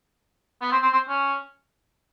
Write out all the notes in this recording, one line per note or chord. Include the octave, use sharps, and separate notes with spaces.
B3
C4
C4
C4
C#4